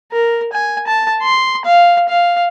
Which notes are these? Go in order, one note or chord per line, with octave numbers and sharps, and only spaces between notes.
A#4
G#5
A5
C6
F5
F5